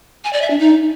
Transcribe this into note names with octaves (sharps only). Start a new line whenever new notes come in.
G#5
D5
E5
D4
D#4